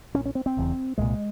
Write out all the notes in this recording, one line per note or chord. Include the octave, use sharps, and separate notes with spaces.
A#1 A#2 C#4
C#4
C4
C4
E1 E2 C#3
C2 A#2 G#3